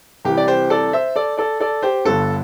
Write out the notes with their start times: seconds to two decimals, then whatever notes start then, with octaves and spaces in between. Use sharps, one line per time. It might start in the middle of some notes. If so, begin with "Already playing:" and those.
0.25 C2 C3 E3 G4
0.37 D5
0.48 G4 C5
0.70 A4 D5
0.93 C5 E5
1.16 A4 D5
1.37 A4 D5
1.60 A4 D5
1.83 G4 C5
2.05 G1 G2 D3 A4